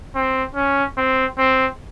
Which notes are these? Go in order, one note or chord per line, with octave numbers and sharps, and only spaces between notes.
C4
C#4
C4
C4